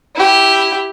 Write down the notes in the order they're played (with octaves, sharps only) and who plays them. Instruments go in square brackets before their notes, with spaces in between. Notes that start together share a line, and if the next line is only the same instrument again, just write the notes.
[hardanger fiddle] E4 G4